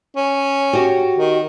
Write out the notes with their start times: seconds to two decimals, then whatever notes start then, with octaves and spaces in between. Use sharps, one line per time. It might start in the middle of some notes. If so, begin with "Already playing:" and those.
0.16 C#4
0.73 F#4 G4
1.19 D#3